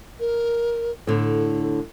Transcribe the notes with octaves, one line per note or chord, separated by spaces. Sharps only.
A#4
A2 D3 A4